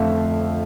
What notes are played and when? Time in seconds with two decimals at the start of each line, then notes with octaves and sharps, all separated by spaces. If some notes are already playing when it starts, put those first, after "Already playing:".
Already playing: F2 D3 A3 E5 F5